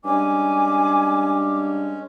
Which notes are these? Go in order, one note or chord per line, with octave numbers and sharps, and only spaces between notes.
G2 G#3 C#4 G#5 D6